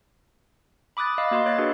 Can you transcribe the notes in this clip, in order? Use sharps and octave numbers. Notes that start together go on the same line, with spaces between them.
B5 D6 D#6 F#6 A6
D#5 F5 B5 A6
A#3 F#4 D#5 C6
C#5 F#6 A6 A#6
D4 F#4 G#4 B4